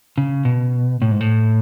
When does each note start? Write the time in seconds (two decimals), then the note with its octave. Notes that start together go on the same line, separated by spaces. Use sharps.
0.18 C#3
0.45 B2
1.02 A2
1.11 G#2
1.21 A2